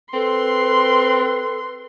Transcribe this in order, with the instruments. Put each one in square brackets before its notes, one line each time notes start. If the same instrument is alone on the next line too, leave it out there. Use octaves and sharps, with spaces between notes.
[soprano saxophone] C4 [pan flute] A4 [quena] B4 [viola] C6